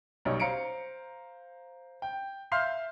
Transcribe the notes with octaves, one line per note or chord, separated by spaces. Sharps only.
B1 G3 D#4 C#5
C5 F5 A#5 C#7 D7
G5
E5 F5 C6 F6 G6 C7